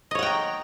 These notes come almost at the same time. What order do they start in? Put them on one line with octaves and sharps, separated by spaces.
D#5 C#5 F#5 G5 A#5